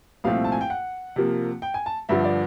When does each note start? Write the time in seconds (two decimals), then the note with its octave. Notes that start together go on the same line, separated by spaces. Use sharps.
0.24 C2 A#2 F3 A3 C4 F5
0.44 A5
0.52 G#5
0.61 G5
0.70 F#5
1.16 C3 F3 A#3
1.62 G5
1.74 G#5
1.86 A5
2.09 G2 D3 F3 E5
2.24 D5